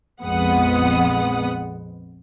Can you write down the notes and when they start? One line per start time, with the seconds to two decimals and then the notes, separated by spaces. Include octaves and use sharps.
0.23 A#1 F2 G#3 B3 F#5 D#6